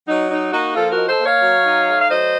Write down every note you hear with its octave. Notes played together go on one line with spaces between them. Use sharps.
F#3 D#4
D#4
A#3 D#4 F#4
F3 F4 A4
F#4 A#4
D#4
A4 C5
A#3
C#5 F5
F#3
D#4
A3
F5
F#3 C5 D#5